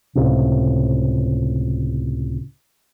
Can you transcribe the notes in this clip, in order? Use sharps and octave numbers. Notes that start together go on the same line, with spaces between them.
C#2 A2 C3